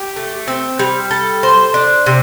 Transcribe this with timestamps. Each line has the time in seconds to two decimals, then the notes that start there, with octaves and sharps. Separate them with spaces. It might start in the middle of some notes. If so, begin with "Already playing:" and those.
Already playing: G4
0.16 A3
0.48 C4
0.79 G3
1.11 A4
1.43 C5
1.74 D4
2.06 C3